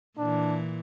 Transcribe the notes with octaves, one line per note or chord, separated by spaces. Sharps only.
A#2 E3 D4